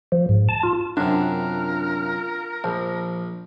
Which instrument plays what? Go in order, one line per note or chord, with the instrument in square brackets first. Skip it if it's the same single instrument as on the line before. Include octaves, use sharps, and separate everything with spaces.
[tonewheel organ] F3
G#2
A5
F4
[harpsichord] F#2 C3 [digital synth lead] D4 [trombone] F4 [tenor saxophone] A#4
[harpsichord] A#1 [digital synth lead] F3